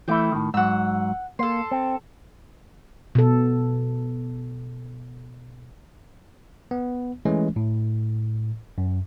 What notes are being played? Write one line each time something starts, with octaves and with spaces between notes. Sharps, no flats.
E3 A3 E4 G5 D6
A2 D#3
G#2 F#3 F#5 E6
A#3 A4 C6
C4
B2 A4
B3
E3 G#3 A3 C#4
A2
F#2